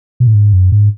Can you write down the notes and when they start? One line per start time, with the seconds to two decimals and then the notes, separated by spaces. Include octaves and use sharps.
0.20 B2
0.27 A2
0.34 G#2
0.53 F#2
0.72 G#2